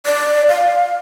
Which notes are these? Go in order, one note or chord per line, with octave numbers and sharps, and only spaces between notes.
D5
F5